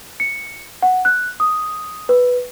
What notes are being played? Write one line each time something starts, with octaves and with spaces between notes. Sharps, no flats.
C#7
F#5
F#6
D#6
B4